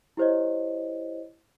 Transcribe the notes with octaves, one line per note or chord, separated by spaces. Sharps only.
E4 G4 C5 C#5 D#5